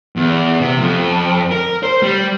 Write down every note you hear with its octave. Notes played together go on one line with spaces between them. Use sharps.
E2
C3
F2
A#4
C5
G3